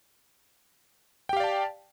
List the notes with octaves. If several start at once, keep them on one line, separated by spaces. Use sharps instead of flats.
G4 D5 F5 G5 A5